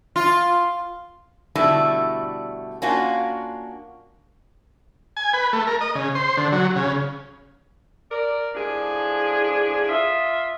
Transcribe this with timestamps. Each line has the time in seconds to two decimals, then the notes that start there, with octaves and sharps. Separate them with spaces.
0.16 F4
1.55 B2 D3 G3 A3 E4
2.82 A#3 C#4 D4 F4 F#4
5.17 G#5
5.33 B4
5.53 A3
5.67 A#4
5.81 D#5
5.95 C#3
6.15 C5
6.37 D3
6.52 F#3
6.76 C#3
8.11 A#4 D5
8.55 A2 F3 D4 G#4
9.89 F4 D#5 E5